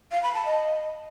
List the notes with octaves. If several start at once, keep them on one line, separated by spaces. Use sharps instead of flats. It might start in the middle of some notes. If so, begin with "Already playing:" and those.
F5
B5
A5
D#5